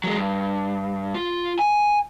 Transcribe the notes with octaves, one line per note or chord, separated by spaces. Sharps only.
F#3 G#3
G2
F4
G#5